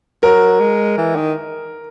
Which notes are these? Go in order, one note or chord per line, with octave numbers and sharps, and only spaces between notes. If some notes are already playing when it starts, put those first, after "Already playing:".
F#3 A#4
G#3
E3
D#3